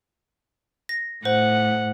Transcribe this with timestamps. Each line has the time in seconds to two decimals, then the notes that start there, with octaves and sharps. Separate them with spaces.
0.89 A#6
1.25 A2 C5 F#5